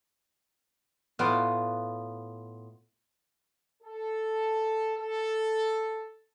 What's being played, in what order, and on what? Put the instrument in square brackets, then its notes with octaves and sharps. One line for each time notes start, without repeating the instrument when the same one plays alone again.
[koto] A2 B3 F4 D5 F#5
[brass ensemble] A4
A4